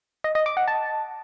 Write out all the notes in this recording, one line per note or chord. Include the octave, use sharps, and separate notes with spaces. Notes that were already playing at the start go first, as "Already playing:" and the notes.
D#5
D#5
D6
F#5
A5